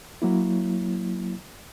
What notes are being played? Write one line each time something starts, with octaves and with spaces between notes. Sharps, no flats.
F#3 A#3 E4